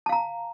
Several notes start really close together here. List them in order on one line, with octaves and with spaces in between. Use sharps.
A5 F5 A#5